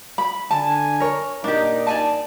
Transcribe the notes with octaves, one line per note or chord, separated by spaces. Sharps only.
B5
D3 D4 G#5 A5
A#4 C#5
A#2 D4 D#4 G4 A#4
D5 G#5 A5